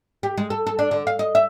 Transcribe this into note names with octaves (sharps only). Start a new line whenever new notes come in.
G4
G#3
A4
A4
D4
D3
F5
D#5
E5